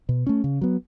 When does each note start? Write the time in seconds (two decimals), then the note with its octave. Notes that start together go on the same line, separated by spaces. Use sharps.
0.09 B2
0.27 A3 C#4
0.44 C#3
0.61 F#3 B3